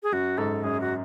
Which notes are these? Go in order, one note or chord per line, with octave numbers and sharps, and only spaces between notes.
G#4
F#2 F#4
G#2 A4
F#2 G#4
F#4